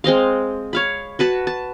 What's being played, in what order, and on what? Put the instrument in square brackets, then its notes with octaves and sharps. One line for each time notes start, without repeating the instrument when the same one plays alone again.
[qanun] G#3 C4 D#5 F5
C#5 F5 B5
F#4 B4 A5 B5
A5